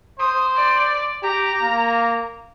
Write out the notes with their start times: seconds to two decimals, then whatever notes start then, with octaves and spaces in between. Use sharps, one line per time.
0.20 C5 D#6
0.56 D5
1.23 G4 A#5
1.62 A#3